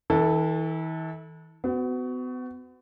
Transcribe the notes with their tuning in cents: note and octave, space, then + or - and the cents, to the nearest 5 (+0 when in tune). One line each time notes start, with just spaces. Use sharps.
E3 -40 A4 +0
B3 +40 F#4 +10